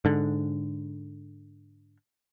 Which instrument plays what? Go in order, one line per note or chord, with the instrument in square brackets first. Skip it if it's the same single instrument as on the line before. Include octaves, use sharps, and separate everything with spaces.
[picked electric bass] G#2 D3